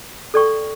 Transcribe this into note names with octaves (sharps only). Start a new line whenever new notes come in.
A4 D5 G5 C#6